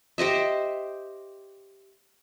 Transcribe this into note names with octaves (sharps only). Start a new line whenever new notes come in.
G4 C5 D#5 E5